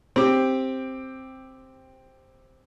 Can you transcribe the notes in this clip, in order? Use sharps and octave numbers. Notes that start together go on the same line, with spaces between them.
C4 G4